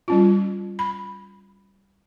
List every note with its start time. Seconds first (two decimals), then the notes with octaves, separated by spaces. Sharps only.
0.08 G3 C#4 F4
0.79 B5